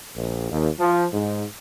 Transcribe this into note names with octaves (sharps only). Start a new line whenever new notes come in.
A#1
D#2
F3
G#2